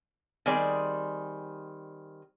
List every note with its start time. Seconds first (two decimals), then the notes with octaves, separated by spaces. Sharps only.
0.46 D#3 G3 C4 G#4 D5